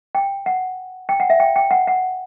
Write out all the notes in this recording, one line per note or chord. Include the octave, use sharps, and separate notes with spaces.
G5
F#5
G5
F#5
E5
G5
G5
F#5
F#5